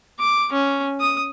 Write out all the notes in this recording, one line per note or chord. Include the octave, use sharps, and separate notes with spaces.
D6
C#4
D#6